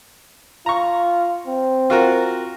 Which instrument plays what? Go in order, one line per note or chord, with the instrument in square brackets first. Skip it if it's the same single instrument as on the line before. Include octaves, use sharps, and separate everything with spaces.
[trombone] F4 [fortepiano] A#5 C#6
[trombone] C4
[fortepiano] F4 F#4 A#4